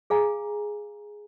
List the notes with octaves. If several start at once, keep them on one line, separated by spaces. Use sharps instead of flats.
G#4 F5 G#5 A#5